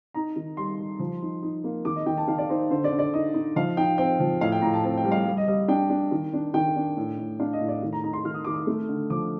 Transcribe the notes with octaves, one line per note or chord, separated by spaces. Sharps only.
D#4 A#5
D#3
G3 C6
G3
F3
D#4
D#4
A#3
D#3 D6
D#5
D#3 G5
A5
D#3 F5
D5
D#4 C5
D3 C5
D5
D3
D5
D#4 D#5
D#4
F3 F5
D#4 G5
C4 G5
F3
A2 F5
G5
A2 A#5
A5
C4 A5
G5
G3
F5
G3
D#5
G3 D#5
D4 G5
D4
D#3
D4
D#3 G5
D4
A2
A2
D4 F5
D#5
A2
D5
D#3
A#5
D#4 A#5
C6
D#3 F6
D#6
D#3 D6
D#6
A3
D3
F3 D6